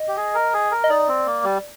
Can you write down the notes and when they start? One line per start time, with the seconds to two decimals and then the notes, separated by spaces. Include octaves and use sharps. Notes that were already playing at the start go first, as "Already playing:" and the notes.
Already playing: D#5
0.08 G4
0.17 G#4
0.35 A#4
0.54 G#4
0.71 A#4
0.84 D#5
0.90 D#4 D5
1.08 C4
1.26 A#3
1.44 G3